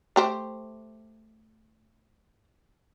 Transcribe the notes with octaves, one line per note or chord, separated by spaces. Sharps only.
A3 G4 C5